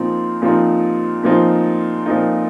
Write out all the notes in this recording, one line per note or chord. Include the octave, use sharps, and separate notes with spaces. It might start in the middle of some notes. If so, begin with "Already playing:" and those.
Already playing: A#2 F3 C4 D#4
A#2 F3 C4 D#4
A#2 F3 C4 D#4
A#2 F3 C4 D#4